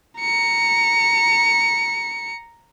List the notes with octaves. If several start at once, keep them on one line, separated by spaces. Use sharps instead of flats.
A#5 C#7